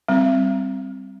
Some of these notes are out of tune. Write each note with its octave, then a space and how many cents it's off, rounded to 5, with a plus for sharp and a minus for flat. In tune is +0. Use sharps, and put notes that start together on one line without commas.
G3 +0 C4 +0